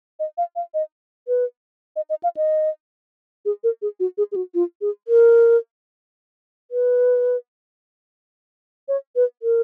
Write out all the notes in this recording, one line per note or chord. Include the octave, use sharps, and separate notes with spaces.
D#5
F5
F5
D#5
B4
D#5
D#5
F5
D#5
G#4
A#4
G#4
F#4
G#4
G#4
F#4
F4
G#4
A#4
B4
C#5
B4
A#4